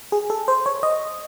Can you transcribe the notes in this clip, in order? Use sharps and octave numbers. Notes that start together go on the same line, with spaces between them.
G#4
A4
C5
C#5
D#5